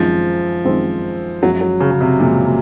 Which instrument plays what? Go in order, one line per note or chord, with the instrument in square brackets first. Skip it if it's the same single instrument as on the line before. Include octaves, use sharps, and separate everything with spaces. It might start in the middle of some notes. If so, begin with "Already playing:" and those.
Already playing: [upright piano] F#2 D#3 G#3 C4 [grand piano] F3
[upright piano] F#2 D#3 G#3 C4
[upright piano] F#2 F3 G#3 [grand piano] F#3
[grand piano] F#3
C#3
C#3
C3
[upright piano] F#2 F3 G#3 [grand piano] A#2
[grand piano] A#2